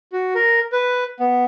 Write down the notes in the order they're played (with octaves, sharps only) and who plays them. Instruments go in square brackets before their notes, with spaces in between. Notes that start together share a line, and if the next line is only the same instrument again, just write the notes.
[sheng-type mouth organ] F#4
A#4
B4
B3